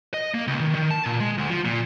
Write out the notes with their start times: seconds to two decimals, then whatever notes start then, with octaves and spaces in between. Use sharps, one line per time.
0.14 D#5
0.34 A#3
0.47 C#2
0.61 D#3
0.75 D#3
0.91 A5
1.06 A#2
1.20 G#3
1.38 D2
1.50 F3
1.65 A#2